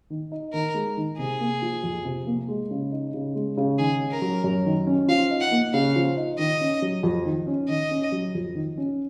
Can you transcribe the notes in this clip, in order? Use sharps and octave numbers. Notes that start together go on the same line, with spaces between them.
D#3
D#4
D#3 A#4
G#3
D#3
C3 G#4
A#3
F3
F2
C3
A#3
G#3
C#3
D#4
C#3
G#3
C#3
D#3 G#4
C#4
A#4
F#3
F#2
D#3
C#4
F3 F5
D#4
F#5
A#3
C#3 F5
F3
D#4
D#3 D#5
C#4
F#3
F2
D#3
C#4
D#3 D#5
C#4
F#3
F2
D#3
C#4